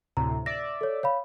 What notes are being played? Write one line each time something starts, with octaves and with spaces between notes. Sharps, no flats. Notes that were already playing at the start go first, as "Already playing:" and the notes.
D2 A2 C3 A#5
D5 E5 A#6
A4 C#5
C#5 F5 B5